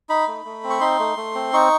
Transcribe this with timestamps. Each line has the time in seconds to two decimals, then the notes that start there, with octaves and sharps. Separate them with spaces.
0.09 D#4 B5
0.28 A3
0.45 A3
0.64 C4
0.70 C#6
0.81 D#4 C6
0.99 A3
1.17 A3
1.35 C4
1.53 D#4 C#6